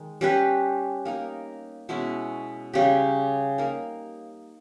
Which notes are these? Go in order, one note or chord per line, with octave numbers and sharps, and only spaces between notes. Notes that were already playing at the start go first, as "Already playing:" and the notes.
Already playing: D#3 G#3 D#4
G3 C#4 G4 B4
A#3 D#4 A#4
B2 G#3 C#4 E4
C#3 G3 C#4 G4
A#3 D#4 A#4